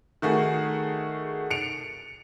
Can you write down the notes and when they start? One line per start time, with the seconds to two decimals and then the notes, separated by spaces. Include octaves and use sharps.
0.22 D#3 A3 F#4 G#4
1.50 C#7 D7 F7